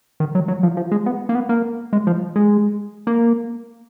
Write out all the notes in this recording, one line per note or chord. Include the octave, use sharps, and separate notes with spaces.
D#3
F#3
F#3
F3
F3
G#3
B3
A#3
B3
A#3
G#3
F3
G#3
A#3